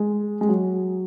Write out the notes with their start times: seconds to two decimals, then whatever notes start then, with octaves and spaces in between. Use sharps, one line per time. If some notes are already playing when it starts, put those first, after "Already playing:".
Already playing: G#3
0.41 G#3
0.49 F#3